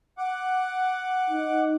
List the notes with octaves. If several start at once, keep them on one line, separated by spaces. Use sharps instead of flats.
F#5 D6
D#4